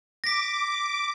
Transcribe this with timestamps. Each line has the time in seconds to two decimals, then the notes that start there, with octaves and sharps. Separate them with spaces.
0.24 D6 A#6 B6